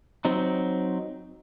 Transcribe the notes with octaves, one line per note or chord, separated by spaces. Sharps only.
F#3 C4 D#4